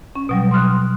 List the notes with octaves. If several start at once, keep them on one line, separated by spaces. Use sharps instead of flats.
C#4
B2 F#3 G3
C6 D#6 F6 F#6